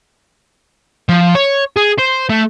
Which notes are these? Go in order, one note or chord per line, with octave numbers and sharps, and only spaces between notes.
F3
C#5
G#4
C5
A3